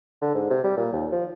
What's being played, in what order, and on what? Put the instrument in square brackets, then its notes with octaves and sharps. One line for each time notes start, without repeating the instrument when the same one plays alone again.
[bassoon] D3
G#2
C3
G3
A#2
D#2
F3